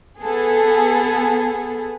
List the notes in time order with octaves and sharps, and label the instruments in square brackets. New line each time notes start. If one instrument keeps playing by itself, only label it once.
[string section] B3 G#4 A4